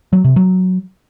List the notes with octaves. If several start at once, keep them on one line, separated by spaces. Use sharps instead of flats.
F#3
C3
F#3